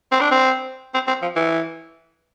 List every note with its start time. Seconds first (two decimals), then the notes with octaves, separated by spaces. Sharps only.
0.11 C4
0.21 D4
0.31 C4
0.94 C4
1.08 C4
1.22 F3
1.36 E3